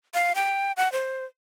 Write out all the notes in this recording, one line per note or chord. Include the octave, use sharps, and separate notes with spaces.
F5
G5
F#5
C5